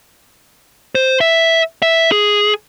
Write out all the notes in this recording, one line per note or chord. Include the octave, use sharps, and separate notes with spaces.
C5
E5
E5
G#4